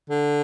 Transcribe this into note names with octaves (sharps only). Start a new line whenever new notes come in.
D3